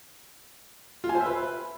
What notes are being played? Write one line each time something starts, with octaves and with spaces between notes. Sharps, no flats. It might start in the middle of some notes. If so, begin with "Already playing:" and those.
F4
G#5
C5
E5
B4